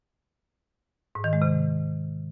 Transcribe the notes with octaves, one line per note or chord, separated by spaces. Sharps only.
G#2
D#3
G#3
C3